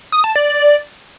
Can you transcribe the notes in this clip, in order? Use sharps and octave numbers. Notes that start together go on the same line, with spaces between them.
D#6
A5
D5